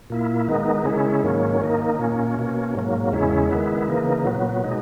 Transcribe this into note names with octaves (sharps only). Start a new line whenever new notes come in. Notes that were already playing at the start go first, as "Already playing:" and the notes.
A#2 A#3 E4
D#3 G#3 B3 D#4
C#3 G#3 C#4 E4
G#2 D#3 F#3 A#3 C#4
D#3 A#3 D#4
A#2 A#3 C#4
B2 A#3 C#4
G#2 F#3 A#3
E2 C#3 G#3 C#4 E4
D#3 G#3 B3 E4
C#3 E3 A#3 D#4
A#2 F#3 B3
B2 G#3 D#4